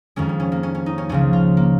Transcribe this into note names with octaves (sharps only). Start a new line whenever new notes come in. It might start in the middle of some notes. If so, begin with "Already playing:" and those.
F2 D#3 G#3 C#4
C#4
C#4
A#3
C#4
C#4
D#4
C#4
C#2 C#3 F3 C#4
F4
A#3